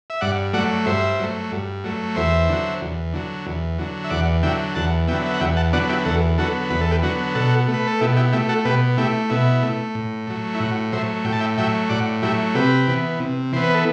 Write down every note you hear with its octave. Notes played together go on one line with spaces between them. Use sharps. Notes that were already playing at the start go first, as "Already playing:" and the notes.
E5
G2 D5 F#5
F#3 A3 D5 F#5
G2 C5 E5
F#3 A3
G2
F#3 A3
E2 C5 E5
D3 F#3
E2
D3 F#3
E2
D3 F#3
E5
E2 D5 F#5
D3 F#3 E5 G5
E2 F#5 A5
D3 F#3 B3 E5 G5
E5
F#5
E2 E5 G5
F#5 A5
D3 F#3 B3 D5 F#5
E4 G4
E2 F#4 A4
D3 F#3 B3 F#4 A4
E2 B4
A4
G4 B4
D3 F#3 B3 F#4
B2 F#4 A4
A3
B4
A4
B2 E4 G4
E4 G4
A3 E4 G4
F#4 A4
B2 G4 B4
A3 E4 G4
B2 E4
A3
A2
F#3 A3
E4
A2 F#4
F#3 A3 C5 E5
A2 G5
A5
E5 G5
F#3 A3 E5 G5
A2 D5 F#5
F#3 A3 E4 G4
C3 G4 B4
E3 B3
C3
E3 B3 C5
B4
A4